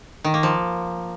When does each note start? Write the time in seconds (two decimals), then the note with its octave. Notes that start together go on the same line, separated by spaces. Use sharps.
0.24 D#3
0.34 A#3
0.43 F3